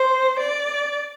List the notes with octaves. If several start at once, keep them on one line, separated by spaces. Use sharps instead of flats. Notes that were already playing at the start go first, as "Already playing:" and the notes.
Already playing: C5
D5